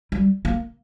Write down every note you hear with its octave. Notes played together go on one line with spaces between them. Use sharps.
G3
A#3